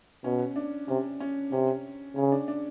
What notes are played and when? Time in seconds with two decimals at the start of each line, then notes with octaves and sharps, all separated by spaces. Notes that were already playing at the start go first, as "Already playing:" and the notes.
0.24 B2 C#4
0.56 D4
0.88 C3 C#4
1.20 C#4
1.52 C3 C#4
2.16 C#3 C#4
2.32 D4
2.48 D4